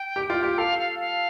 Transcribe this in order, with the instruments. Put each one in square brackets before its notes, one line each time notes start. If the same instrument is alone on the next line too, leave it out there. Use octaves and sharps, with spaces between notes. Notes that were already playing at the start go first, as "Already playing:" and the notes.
Already playing: [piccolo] G5
[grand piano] G4
F4
G4
[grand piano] A4 [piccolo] F5
[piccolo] F5
F5